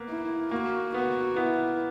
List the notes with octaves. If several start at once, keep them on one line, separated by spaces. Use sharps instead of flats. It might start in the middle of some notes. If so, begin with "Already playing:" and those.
Already playing: A#3 B3
E4
A#3 F#4
B3 F#4
B3 E4